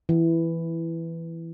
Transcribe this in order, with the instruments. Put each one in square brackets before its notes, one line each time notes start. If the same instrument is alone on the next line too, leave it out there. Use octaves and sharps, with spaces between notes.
[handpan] E3